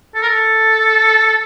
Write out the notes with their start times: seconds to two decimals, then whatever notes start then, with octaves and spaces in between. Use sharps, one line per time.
0.14 A4
0.22 A#4
0.28 A4